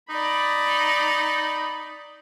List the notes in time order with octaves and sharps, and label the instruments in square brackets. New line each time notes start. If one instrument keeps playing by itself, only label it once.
[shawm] D#4 [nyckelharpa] D5 B5